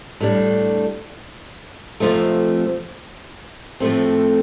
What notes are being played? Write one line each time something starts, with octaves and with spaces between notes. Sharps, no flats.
A2 G3 D4
F2 C3 F3 A3
A2 F3 A3 C4